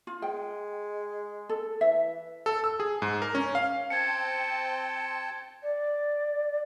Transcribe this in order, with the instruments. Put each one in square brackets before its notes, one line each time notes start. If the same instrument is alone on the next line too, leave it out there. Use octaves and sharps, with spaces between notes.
[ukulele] F4
[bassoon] G#3 [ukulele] G5
[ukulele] A4
[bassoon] E3 [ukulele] E5
[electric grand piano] A4
E6
G#4
G#2
A#4
C#4
F5
[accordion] C4 G5 A5 [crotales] G#6 C#7
[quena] D5